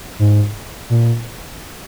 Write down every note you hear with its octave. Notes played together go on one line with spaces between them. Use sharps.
G#2
A#2